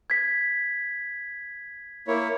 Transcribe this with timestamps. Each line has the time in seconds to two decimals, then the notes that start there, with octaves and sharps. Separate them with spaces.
0.10 G#6 B6
2.08 A#3 E4 C#5